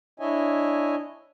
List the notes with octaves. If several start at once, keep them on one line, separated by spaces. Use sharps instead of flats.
D4 E4 C#5 D#5 E5 G#5